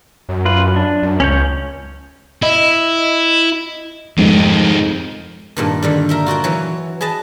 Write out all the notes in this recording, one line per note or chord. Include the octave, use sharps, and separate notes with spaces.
F#2
F4 B4
D4
F#2
C#2 C#4 C#5 G6
E4 D#5
F1 F2 G#2 D#3 F3 G#3 D#7
G2 A#2 D#3
D3 D#3 G3
A#4 E5 G5
F4 F#4 A#4 G5
E3 F#3
G#4 B4 D#5 A5